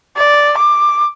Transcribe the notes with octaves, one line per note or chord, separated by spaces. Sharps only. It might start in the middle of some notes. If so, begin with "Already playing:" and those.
D5
D6